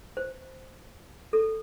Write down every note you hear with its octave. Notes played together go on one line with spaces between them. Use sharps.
C5
A4